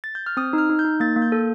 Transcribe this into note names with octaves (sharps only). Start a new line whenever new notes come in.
A6
G6
F6
C4 D#6
D#4
F6
D#4
G6
D#4
A#3 A6
A#3
G6
A4